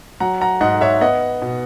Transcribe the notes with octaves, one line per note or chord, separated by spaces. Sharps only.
F#3 F#5 A#5
F#5 A#5
G#2 D#5 F#5
C#5 E5
B3 D#5 F#5
B2